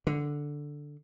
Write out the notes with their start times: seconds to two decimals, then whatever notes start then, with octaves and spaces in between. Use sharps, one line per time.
0.07 D3